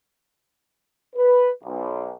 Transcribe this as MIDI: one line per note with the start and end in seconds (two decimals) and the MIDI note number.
1.15 1.49 71
1.63 2.10 35